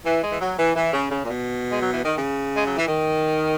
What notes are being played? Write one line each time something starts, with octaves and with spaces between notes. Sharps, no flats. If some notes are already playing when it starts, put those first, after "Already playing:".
E3
G#3
E3
F#3
E3
E3
C#3
C#3
A#2
B2
G#3
F#3
E3
D#3
C#3
G#3
F#3
E3
D#3